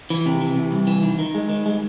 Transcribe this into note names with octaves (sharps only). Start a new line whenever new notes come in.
E3
C3
E3
C3
C2
E3
D#3
D#3
G#3
D#3
G#3